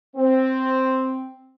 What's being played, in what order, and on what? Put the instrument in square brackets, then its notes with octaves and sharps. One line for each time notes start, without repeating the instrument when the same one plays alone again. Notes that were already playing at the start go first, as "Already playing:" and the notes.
[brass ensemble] C4